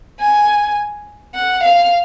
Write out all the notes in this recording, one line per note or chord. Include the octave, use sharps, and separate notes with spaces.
G#5
F#5
F5